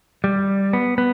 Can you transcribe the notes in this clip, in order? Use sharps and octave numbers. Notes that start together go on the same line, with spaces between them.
G3
B3
B3